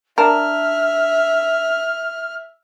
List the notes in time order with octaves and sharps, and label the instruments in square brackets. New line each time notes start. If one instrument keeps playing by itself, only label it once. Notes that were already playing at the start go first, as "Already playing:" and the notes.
[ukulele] D4 D5 A5 [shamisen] A#4 [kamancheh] E5 [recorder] F6